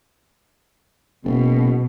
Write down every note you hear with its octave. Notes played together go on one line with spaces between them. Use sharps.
F#1 B2